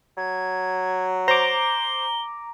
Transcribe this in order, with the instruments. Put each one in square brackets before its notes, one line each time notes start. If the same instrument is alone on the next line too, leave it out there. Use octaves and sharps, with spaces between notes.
[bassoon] F#3 [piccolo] G#6
[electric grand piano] C5 [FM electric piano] A#5 D6 [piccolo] G7